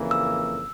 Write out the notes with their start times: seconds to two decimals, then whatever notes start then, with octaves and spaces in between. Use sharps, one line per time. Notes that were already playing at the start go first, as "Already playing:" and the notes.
Already playing: F2 C#3 E3 A#3
0.11 E6